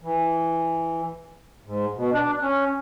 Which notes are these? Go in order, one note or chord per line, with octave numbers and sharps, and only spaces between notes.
E3
G#2
B2
D4
C#4